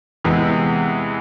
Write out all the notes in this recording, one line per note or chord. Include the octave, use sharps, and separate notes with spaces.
E2 C3 E3 G#3